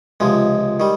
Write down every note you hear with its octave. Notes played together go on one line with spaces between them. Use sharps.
C#2 C3 F3 G#3
D#3 G3